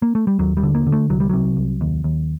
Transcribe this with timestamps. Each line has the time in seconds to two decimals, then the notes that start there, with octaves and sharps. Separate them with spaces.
0.02 A#3
0.15 A3
0.27 G3
0.39 D#2 F#3
0.57 G3
0.63 D3
0.75 A#3
0.87 D3
0.92 A3
1.09 C2 F#3
1.20 G3
1.29 C3 F#3
1.57 C2
1.81 D#2
2.04 D#2